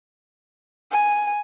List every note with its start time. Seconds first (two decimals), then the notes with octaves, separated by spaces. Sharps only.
0.92 G#5